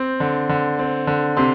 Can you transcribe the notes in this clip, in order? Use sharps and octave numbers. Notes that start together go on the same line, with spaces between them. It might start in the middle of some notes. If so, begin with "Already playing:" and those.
Already playing: C4
D3
D3
C4
D3
C3 C6